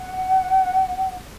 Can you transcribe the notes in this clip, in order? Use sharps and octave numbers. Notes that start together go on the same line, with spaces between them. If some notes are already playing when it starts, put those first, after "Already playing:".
Already playing: F#5